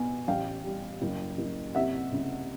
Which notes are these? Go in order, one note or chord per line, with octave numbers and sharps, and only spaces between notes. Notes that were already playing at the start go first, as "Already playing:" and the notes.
Already playing: B2 B3 G#5
A1 F5 G5
G3
F#1
F#1
C3 E5 F#5
C#2